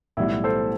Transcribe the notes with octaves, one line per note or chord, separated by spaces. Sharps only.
B1 A2 E3 G3 B3 E4
A4 C5